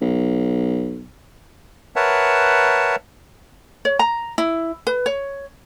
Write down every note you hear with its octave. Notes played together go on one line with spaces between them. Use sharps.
B1
A#4 B4 C#5 E5 F#5 A5
C#5
A#5
E4
B4
C#5